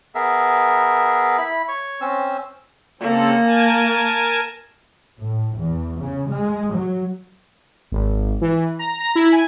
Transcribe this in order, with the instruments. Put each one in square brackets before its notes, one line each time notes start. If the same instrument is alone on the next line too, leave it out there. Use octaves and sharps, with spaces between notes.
[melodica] B3 G#4 A#4 E5
E4 B5
C#5 C#6
C4 C#4 E6
[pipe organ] C#3 C4 A4 [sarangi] A#3
[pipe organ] A#4 G#5 A5
[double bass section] A2
E2
C#3
G#3
F#3
[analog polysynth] G#1
E3
A#5
A#5
E4
G#5